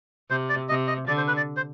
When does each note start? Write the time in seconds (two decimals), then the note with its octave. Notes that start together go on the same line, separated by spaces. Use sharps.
0.30 C3 C5
0.49 D5
0.69 C3 D#5
0.88 D#5
1.08 D3 D5
1.17 C5
1.28 B4
1.37 D5
1.57 C5